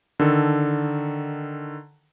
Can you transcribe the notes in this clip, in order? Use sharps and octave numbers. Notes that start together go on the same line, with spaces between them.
D3 D#3 A4